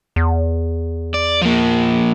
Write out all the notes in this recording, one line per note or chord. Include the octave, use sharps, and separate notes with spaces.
E2
D5
F3 A#3